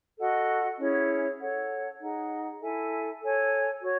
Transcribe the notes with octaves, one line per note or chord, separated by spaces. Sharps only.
F#4 A4 D#5 F#5
C#4 E4 G#4 C#5
A4 C#5 F#5
D#4 G#4 D#5 F#5
E4 A4 E5 G#5
A4 C#5 G#5
F#4 C#5